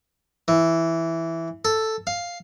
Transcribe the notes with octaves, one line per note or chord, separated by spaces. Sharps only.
E3
A4
F5